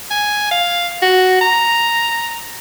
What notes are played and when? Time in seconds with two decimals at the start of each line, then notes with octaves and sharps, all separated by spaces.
0.10 G#5
0.51 F5
1.02 F#4
1.41 A#5